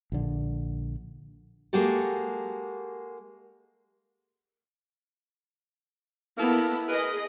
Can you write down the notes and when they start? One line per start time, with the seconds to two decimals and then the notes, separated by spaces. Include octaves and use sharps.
0.12 A#1 D3
1.73 G#3 A#3 F#4 G4 A4
6.38 A#3 B3 E4 A4 A#4
6.88 G#4 A#4 B4 D#5